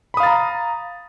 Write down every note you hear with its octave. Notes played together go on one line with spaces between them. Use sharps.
F5 A#5 B5 D#6 A6